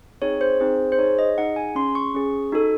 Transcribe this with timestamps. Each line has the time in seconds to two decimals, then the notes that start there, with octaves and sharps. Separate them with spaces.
0.22 C4 D#4 G#4 C#5
0.41 C5
0.60 C4 D#4 G#4
0.92 C5
0.99 D#4 G#4 C#5
1.19 D#5
1.37 D#4 G#4 F#5
1.56 G#5
1.75 C#4 G#4 C6
1.95 C#6
2.14 C#4 G#4
2.52 D#4 F#4 A4